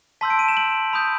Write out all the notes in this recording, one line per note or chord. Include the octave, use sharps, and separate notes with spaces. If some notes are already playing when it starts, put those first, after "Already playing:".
A5 C6 E6 G6 B6
D7
D#7
E7
F#7
B5 D#6 G6